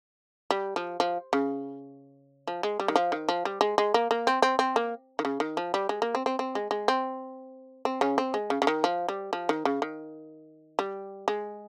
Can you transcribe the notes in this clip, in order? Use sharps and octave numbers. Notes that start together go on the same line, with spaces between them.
G3
F3
F3
C#3
F3
G#3
G3
D#3
F3
D#3
F3
G3
G#3
G#3
A#3
A#3
C4
C4
C4
A#3
D#3
C#3
D#3
F3
G3
G#3
A#3
C4
C4
C4
G#3
G#3
C4
C4
C#3 C#4
C4
G#3
C#3
C#3
D#3
F3
G3
F3
D#3
C#3
D#3
G3
G#3